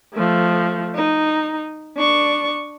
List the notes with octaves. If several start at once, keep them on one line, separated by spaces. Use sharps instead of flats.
F3 A3
D#4
D4 C#6